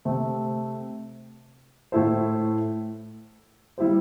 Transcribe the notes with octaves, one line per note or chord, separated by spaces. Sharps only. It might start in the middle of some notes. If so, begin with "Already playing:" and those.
C3 A3 C4
A2 A3 E4 A4 C5
G3 E4 G4 C5